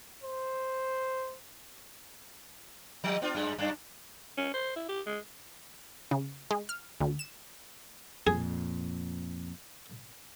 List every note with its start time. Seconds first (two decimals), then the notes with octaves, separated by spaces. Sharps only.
0.23 C5
3.04 F3 G3
3.22 B3 D4 F4
3.35 F#2 G3 G#3
3.58 F#2 D4
4.37 C#4
4.54 C5
4.76 E4
4.89 G4
5.06 G#3
6.11 C#3
6.51 G#3
6.69 F6
7.01 D2
7.19 E7
8.27 F2 A#2 G#4